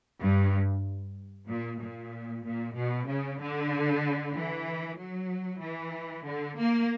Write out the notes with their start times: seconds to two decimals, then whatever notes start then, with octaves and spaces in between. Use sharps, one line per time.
0.19 G2
1.47 A#2
1.79 A#2
2.44 A#2
2.75 B2
3.07 C#3
3.39 D3
4.35 E3
4.99 F#3
5.62 E3
6.27 D3
6.59 A#3